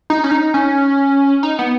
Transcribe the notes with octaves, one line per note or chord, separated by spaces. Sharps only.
D#4
C#4
D#4
C#4
D#4
B3